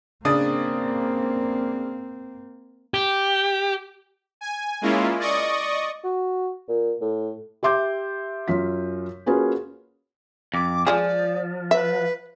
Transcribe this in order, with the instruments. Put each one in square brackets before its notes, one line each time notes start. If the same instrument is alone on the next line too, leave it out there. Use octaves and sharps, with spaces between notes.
[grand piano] C#3 D4 D#6 [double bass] A#3 C4
[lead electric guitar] G4
[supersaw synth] G#5
G#3 A#3 C#4 E4 F4
D5 D#5 C#6 D#6
[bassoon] F#4
A#2
A2
[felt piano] G4 E5 C6 D6 G6
F#2 F4 B6
A#3 C#4 F4 F#4 G#4 B4
[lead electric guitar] F2 [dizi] D6
[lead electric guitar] F3 [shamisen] G#3 F4 G#4 [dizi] D5
[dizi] B4 [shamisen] E5